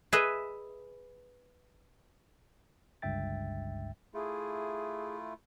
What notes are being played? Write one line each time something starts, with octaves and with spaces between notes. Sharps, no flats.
G#4 B4 D#5 E5
G1 C#2 G2 E5 G5 A6
A3 E4 F4 G#4